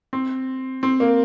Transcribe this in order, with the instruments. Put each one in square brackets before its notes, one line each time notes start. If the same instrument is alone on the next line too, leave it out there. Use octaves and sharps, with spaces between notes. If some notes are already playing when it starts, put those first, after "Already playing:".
[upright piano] C4
C4
A#3